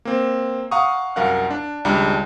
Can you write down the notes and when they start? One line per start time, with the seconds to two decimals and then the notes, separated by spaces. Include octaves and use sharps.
0.05 A#3 C4
0.71 F5 F#5 A#5 C#6 D#6
1.16 C2 F#2 A#4 F5 F#5 F#6
1.50 D4
1.85 G#1 C#2 G3 D4 A#5 B5